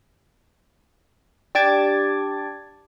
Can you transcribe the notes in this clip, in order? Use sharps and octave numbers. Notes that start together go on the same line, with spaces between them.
D4 G4 A5 D6 G#6 A6